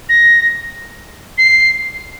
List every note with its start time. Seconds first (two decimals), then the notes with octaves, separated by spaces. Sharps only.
0.09 A#6
1.38 C7